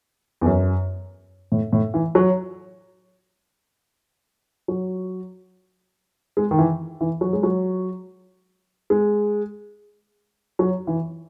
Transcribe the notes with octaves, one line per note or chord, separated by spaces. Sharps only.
E2
F#2
A2
A2
E3
F#3
F#3
G#3
D#3
E3
E3
F#3
G#3
F#3
G#3
F#3
E3